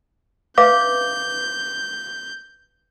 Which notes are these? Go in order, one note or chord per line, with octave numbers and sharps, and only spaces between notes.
B4 E5 F5 D6 G6